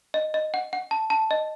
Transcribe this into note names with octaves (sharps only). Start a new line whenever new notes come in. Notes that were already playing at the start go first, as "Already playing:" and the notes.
D#5
D#5
F#5
F#5
A5
A5
D#5